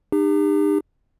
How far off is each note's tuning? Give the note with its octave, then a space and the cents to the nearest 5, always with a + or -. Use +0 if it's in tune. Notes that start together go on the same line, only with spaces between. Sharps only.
D#4 -40 G4 +35